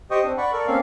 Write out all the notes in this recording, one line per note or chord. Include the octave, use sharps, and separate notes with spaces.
G4 C5 D#5 G5 C#6 D#6
C4 D4 C5
D5 F#5 B5 C#6
A4 A#4 D5 C#6
A#3 C4 C#4 A4 F5